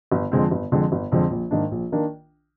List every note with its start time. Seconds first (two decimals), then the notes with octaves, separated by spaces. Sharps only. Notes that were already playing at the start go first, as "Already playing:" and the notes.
0.11 G1
0.32 F2 D3 G#3 C4
0.51 G1
0.71 F2 D3 G#3 C4
0.92 G1
1.12 F2 D3 G#3 C4
1.31 A#1
1.51 G#2 D#3 A#3 D4
1.71 A#1
1.92 D#3 A#3 D4